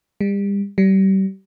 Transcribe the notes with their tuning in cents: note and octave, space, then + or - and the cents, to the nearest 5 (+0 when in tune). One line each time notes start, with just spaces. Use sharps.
G3 +35
G3 -30